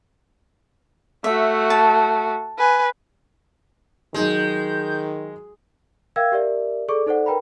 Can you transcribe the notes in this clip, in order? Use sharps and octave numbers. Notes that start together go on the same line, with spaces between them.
A3 F#4 E5
A5
B4 G#5
D#3 F#3 G#3 D#4 G#4 G6
A#4 E5 F5 G5 E6 G#6
G4 A#4 D5 E5
G#4 A4 D5 C#6 D6
D#4 A4 C5 D5 F#5
A#4 B4 G5 A#5 B5